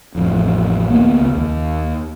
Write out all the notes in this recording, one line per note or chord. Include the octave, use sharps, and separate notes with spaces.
A1 F2
D2 A#3 B3
C#2
D#2